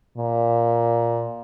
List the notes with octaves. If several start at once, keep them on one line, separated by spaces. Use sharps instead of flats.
A#2